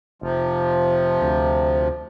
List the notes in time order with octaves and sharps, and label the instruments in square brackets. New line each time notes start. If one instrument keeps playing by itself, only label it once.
[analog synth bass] F1 [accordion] C3 F3
[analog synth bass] D2